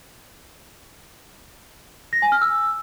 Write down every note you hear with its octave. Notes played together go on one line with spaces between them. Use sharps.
A#6
G#5
F6
E6